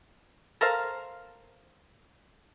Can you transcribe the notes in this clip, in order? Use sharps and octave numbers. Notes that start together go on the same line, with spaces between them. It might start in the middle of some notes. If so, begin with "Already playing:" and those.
A4 A#4 C5 F5